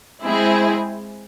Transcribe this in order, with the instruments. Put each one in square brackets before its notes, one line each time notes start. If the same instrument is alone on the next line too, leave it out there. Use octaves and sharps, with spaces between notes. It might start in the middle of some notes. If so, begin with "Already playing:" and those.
[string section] G#3 C4 E4 G#4